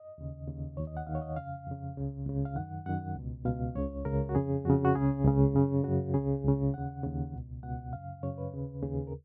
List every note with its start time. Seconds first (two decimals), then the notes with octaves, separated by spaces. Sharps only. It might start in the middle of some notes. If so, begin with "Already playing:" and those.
Already playing: D#5
0.18 D#2 C#3
0.47 D#2 C#3
0.77 D#2 D#3 C#5
0.87 D#5
0.97 F#5
1.07 D#2 D#3 F5
1.15 C#5
1.22 D#5
1.36 F2 C#3 F5
1.67 F2 C#3
1.97 C#2 C#3
2.26 C#2 C#3
2.45 F5
2.56 F#2 D#3 F#5
2.86 F#2 D#3 F#5
3.16 C#2 B2
3.45 C#2 B2 F5
3.75 C#2 C#3 C#5
4.05 C#2 C#3 A#4
4.29 F#4
4.35 F2 C#3 G#4
4.65 F2 C#3 F#4
4.85 F#4
4.95 C#2 C#3 G#4
5.25 C#2 C#3
5.54 F#2 C#3
5.84 F#2 C#3 F#4
6.14 C#2 C#3 G#4
6.44 C#2 C#3
6.74 D#2 C#3 F#5
7.03 D#2 C#3
7.33 C#2 B2
7.63 C#2 B2 F#5
7.93 F#2 C#3 F5
8.23 F#2 C#3 C#5
8.38 B4
8.52 D#2 C#3
8.82 D#2 C#3 G#4
9.07 A#4